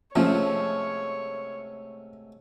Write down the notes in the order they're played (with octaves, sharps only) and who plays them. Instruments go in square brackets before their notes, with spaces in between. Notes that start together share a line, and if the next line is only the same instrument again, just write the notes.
[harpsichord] G#2 C3 A3 [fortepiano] F3 C#4 [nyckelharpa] C#5